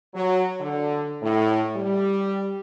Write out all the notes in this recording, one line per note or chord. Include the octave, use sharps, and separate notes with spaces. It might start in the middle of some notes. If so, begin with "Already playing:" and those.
F#3
D3
A2
G3